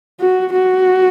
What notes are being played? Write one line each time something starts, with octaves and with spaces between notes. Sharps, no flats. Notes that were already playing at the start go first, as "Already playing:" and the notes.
F#4
F#4